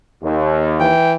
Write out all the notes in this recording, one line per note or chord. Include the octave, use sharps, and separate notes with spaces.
D#2
E3 G5